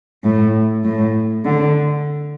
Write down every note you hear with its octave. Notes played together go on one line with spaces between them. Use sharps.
A2
A2
D3